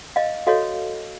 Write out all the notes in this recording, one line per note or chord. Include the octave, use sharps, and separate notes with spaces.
D#5 F5
F#4 A4 C#5 D#5 F5